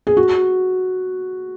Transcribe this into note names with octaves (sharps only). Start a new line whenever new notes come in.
G#4
F#4